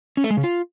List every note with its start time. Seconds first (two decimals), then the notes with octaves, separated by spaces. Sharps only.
0.17 C#4
0.24 A3
0.30 G#3
0.37 C#3
0.44 F4